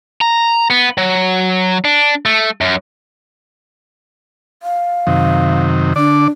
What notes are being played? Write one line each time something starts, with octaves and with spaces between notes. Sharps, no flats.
A#5
B3
F#3
D4
A3
F#2
F5
F#2 C3 D#3
D3 D4 D5